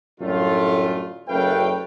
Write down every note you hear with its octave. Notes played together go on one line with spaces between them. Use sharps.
F#2 A2 D3 G3 A3 F4
F#1 F#2 A3 B4 F5 G5